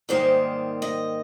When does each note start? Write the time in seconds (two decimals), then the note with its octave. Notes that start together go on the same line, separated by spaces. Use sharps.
0.09 G#2 D#3 G3 A#3 C5
0.82 D#5